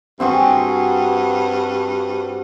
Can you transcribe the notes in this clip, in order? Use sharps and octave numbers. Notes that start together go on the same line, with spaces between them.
G2 C4 F#4 G#4